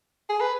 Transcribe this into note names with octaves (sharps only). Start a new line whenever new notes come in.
G#4
B4